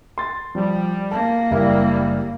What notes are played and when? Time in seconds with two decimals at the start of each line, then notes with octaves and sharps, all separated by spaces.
0.18 C6 A6
0.55 F3 G3
1.12 A#3 A5
1.51 F#1 G3 E4 A#4